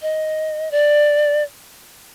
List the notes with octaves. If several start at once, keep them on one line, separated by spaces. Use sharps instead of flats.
D#5
D5